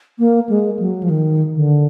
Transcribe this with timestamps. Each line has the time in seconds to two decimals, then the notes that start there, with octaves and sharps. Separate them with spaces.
0.19 A#3
0.49 G#3
0.79 F#3
1.03 F3
1.10 D#3
1.55 D3